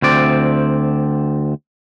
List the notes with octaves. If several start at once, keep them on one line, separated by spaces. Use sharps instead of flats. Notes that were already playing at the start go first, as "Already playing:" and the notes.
D2 C4 D5